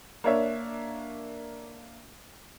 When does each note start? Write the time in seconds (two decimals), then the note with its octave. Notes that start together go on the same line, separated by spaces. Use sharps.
0.24 A#3 D4 C#5 E5